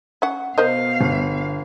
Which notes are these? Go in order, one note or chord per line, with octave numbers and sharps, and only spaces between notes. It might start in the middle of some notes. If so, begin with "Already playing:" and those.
C#4 F#5
B2 A#4 C5 D#5 F5
G1